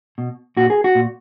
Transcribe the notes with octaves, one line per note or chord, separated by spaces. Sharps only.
B2
A#2 F#4
G#4
F#4
A#2